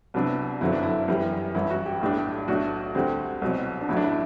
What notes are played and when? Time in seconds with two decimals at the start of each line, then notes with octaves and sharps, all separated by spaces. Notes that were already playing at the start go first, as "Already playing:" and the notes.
0.14 C2 C3 F#3 B3 D4
0.61 G1 F#2 D3 F#3 C4 E4
0.72 D4
0.83 E4
1.08 F#2 E3 G3
1.55 A1 G2 E3 E4
1.70 F#4
1.86 G4
2.01 B1 A2 G3 D4
2.48 B1 A2 F#3 A3 D4 F#4
2.95 D2 D3 G3 C4
3.42 C2 B2 F#3 C4
3.81 D4
3.88 A1 A2 F#3 E4
3.97 D4
4.04 E4